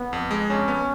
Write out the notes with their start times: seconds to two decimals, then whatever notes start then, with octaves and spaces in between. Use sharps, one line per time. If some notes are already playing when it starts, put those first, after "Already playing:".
Already playing: B3
0.13 F2
0.31 G#3
0.50 F2 C#4
0.68 B3